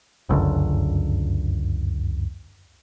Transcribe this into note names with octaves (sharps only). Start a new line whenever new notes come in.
G1 C#2 F#2 D3